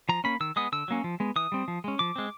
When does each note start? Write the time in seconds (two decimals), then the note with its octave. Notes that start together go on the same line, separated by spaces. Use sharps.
0.09 F3 A#5
0.24 A#3 C#4 B5
0.40 D#3 E6
0.56 G#3 B3 D#6
0.72 D3 E6
0.88 F#3 A#3 C#4
1.04 F3
1.20 G#3 B3
1.36 E3 D#6
1.52 G3 C4
1.68 F3
1.84 G#3 C#4
1.99 F3 D6
2.16 G#3 C4